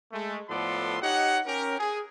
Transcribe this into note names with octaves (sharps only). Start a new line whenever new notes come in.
G#3 A3
A2 F3 B3 A4 D5 C6
D#4 G4 C#5 D#5 F#5
C#4 G4 A#4
G#4